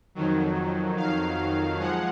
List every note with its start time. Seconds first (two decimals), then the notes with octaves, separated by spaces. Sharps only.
0.15 F2 D#3 F#3
0.97 F5
1.79 F3 G#3 F#5